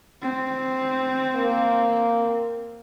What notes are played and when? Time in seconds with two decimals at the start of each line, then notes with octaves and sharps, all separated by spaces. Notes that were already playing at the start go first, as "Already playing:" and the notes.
0.22 C4
1.36 A#3